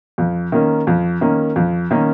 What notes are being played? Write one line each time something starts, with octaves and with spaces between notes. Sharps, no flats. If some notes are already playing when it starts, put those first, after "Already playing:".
F2
D#3 A#3 C#4
F2
D#3 A#3 C#4
F2
D#3 A#3 C#4